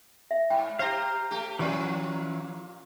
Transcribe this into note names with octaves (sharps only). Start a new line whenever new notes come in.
E5
G#2 G5
G4 C5 F5 A#5
A3 G4
A#2 E3 F3 C#4